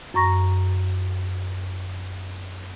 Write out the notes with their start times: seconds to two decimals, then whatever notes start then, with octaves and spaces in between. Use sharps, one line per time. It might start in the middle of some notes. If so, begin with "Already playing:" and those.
0.14 F#2 A#5 C#6 A#6